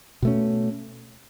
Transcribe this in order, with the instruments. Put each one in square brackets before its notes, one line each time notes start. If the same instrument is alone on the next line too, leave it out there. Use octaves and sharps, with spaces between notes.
[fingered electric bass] B2 A3 C#4